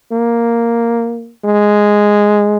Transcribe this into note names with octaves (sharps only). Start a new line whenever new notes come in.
A#3
G#3